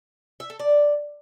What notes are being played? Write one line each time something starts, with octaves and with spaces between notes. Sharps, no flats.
E5
A4
D5